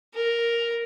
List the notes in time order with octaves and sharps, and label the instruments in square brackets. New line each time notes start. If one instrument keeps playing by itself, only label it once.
[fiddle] A#4